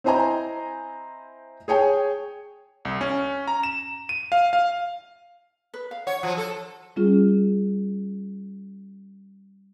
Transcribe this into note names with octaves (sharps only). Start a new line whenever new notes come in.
C4 E4 C5 D#5 G#5 A#5
G#4 C#5 G5 G#5
C2
C#4
A#5
E7
D#7
F5
F5
B4
F5
C#5 F#5
F3 F#3
A4
G3 C#4 F4 G#4